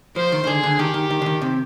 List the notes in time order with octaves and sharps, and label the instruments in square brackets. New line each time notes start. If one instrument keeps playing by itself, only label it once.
[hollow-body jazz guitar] F3 [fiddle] C5
[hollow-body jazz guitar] D#3
D#3
[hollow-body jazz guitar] D3 [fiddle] G#4
[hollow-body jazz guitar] D3
[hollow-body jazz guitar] D#3 [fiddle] G4
[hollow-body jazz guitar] D#3
D#3
D3
D#3
C3